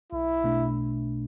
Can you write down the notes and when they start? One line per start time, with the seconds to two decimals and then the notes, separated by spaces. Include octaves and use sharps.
0.12 B1 E4
0.44 B2 A3 D4